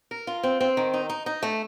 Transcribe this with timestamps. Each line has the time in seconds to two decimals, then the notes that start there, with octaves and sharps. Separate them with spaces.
0.11 A#4
0.27 F4
0.43 C4
0.61 C4
0.77 D#3
0.94 D#4
1.09 D#4
1.26 D#4
1.43 A3